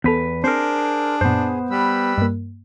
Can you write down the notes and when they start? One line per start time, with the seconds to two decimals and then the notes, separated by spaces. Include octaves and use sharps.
0.04 E2 B3 A4 B4
0.44 C4 D4 G#4 A#4 C5
1.21 F#2 A#2 B3 C5
1.71 G3 B4 B5 E6
2.18 G2 A#3